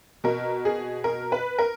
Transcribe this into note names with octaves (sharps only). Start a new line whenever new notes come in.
B2 A#4
G#4
A#4
B4
A#4